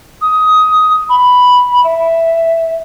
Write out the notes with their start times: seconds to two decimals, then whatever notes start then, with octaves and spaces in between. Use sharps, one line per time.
0.22 D#6
1.09 B5
1.84 E5